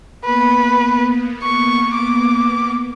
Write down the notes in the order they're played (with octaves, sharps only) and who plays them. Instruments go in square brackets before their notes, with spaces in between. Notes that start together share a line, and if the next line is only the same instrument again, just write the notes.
[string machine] A#3 B3 [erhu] B4
[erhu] C#6
D6